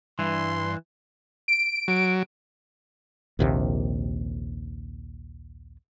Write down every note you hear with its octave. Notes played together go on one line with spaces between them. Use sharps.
G2 E3 C6
D7
F#3
A#1 D#2 C3